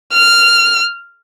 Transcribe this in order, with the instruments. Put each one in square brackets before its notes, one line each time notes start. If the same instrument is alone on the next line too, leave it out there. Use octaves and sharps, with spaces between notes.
[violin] F6